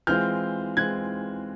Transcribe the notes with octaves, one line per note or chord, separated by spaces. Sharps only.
E3 G#3 C4 F4 F6 G6
E3 G#3 C4 F4 F#6 G#6